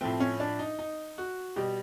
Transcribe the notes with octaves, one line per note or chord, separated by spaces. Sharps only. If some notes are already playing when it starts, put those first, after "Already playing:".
A2 F3 A3 C4
C#4
D4
D#4
D#4
F#4
B2 G3 G4